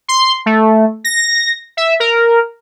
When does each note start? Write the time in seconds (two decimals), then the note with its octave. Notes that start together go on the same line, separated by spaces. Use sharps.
0.08 C6
0.46 A3
1.04 A#6
1.77 E5
2.00 A#4